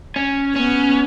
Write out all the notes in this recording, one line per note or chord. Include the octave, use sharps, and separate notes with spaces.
C#4
B3 C#4